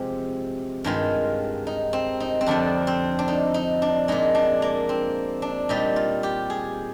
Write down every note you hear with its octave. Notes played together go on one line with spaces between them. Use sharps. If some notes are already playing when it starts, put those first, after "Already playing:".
Already playing: C3 F3 G#3 G4
G2 D#3 G#3 F4
D#4
C4
D#4
C4
F2 D3 F3 D4
C4
D4
D#4
D#4
D4
A#2 G#3 D#4
D4
A#3
C4
D4
A#2 G3 D#4
F4
G4
G#4